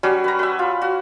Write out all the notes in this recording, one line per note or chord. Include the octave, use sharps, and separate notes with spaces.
F#3 G3 C#4 F#4
B4 A#5
B4 E5
F4
F#4